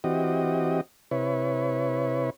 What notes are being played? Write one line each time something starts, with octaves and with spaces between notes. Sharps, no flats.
E3 C4 F#4 G4 D#5
C3 E4 B4 C#5